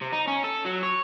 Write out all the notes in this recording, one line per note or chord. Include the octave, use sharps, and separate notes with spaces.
C3
D#4
C#4
A4
F#3
C#5